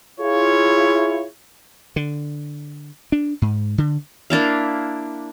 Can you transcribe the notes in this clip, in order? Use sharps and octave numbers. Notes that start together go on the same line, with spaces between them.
E4 F4 G#4 C#5
D3
D4
G#2
D3
A#3 D4 E4 F5